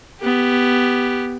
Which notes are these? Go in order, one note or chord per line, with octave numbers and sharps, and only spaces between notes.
B3 G4